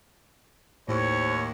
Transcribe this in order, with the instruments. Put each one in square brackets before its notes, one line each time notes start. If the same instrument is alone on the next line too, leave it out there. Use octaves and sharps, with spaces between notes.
[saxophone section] D#2 [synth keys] A2 [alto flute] C5 [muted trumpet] C#5